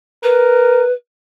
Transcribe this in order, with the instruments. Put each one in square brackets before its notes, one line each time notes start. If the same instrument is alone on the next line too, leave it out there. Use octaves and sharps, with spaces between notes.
[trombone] A#4 [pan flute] B4